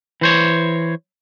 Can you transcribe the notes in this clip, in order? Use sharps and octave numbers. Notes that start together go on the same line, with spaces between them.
E3 C5 C#5